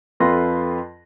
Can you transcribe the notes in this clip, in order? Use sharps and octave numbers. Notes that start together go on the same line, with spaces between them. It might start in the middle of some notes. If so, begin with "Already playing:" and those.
F2 F4 A4 B4 C6 A#6